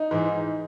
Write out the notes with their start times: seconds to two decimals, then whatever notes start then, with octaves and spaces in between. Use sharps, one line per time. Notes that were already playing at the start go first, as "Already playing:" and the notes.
Already playing: D#4
0.11 G#2 E3